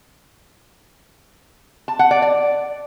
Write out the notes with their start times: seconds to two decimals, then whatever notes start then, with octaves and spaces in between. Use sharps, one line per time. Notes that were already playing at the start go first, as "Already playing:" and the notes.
1.88 A5
1.99 F#5
2.11 D5
2.22 D5